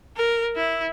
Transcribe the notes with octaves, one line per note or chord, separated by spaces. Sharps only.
A#4
E4